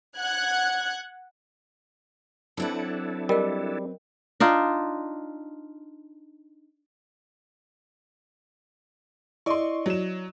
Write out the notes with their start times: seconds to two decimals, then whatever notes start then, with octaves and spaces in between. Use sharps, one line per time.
0.18 F#5 F#6 G#6
2.57 F#3 C4 D4 E4 A4 B4
3.29 G3 A#4 D#5 G5
4.40 D4 D#4 F4
9.46 E4 D5 D#5 C6 C#6
9.86 F#3 E7